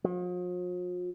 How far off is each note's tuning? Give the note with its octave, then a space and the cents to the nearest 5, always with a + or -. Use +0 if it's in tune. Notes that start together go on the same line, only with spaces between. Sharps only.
F3 +45